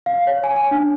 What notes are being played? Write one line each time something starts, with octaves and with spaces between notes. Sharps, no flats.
F5
C#5
G#5
G#5
D4